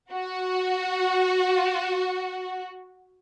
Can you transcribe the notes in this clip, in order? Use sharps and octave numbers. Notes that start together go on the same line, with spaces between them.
F#4